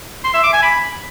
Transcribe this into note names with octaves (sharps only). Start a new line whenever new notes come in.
C6
E5
D6
G#5
B5